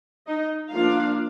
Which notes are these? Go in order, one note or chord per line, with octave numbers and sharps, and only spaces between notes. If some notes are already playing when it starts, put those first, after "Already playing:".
D#4 D#5
F3 A#3 D4 F4 F5